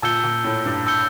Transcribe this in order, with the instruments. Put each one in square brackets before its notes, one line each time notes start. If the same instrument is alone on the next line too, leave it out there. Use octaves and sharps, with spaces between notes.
[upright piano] A#2 [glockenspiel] A5 E6 G6 C#7 G7
[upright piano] A#2
A2
G2
[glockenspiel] A5 E6 G6 C#7 G7